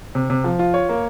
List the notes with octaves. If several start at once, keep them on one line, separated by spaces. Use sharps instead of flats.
C3
C3
F3
F4
C#5
A#3